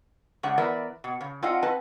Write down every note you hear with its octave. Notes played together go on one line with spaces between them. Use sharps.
C#3 G#3 D4 F#5
E3 B3 A#4 D5 E5
B2
C#3
C4 D4 F4 D#5 F5 F#5
C4 B4 D#5 A5